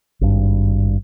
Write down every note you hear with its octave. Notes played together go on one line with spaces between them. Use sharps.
G#1 G2